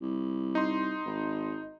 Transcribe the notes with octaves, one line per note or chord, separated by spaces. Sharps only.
C2
D#4 C6
G#1